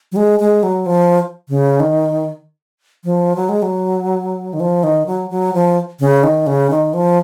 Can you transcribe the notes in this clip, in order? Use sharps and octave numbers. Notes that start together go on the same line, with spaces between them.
F#3
G#3
G#3
F#3
F3
C#3
D#3
F3
F#3
G#3
F#3
D#3
F3
D#3
F#3
F#3
F3
C#3
D#3
C#3
D#3
F3